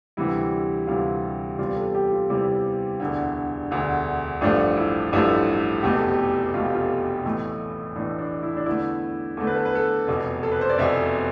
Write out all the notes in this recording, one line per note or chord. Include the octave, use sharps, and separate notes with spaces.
D2 C3 E3 G3 E4
D2 C3 E3 G3 F4
E2 C3 G3 F4
A4
G4
F4
E2 C3 G3 E4
E1 D2 D3
E1 D2 D3
A1 G2 F3 A3 D4
E4
A1 G2 F3 A3 E4
F1 E2 B2 A3 G4
A4
G4
F1 E2 B2 A3 F4
G4
F4
B1 A2 E3 A3
B1 A2 E3 A3 D4
D4
E4
D4
E2 D3 A3 E4
E2 D3 A3 A4
B4
A4
B4
A4
F1 E2 B2
A4
B4
C5
D5
F1 E2 B2 E5